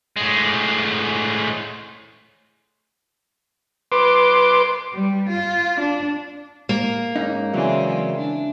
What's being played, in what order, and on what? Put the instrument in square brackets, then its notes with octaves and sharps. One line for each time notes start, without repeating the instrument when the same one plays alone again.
[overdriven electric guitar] A2 G#3
[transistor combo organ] B4 C6 D6
[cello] G3
F4
D4
[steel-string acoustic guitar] A#3
[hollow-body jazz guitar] G#2 C#4 D#4
[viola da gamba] C#3 G#3 C4 [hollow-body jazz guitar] E3 F#3 [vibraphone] D5 E5 G#5
[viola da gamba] D4